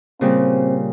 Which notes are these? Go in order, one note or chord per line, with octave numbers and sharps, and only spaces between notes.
A#2 C#3 G3 C4